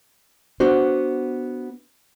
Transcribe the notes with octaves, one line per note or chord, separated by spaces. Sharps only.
B3 D4 F#4 C5